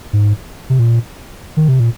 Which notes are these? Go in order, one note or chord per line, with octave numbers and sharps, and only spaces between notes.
G#2
C3
A#2
D#3
C3
A#2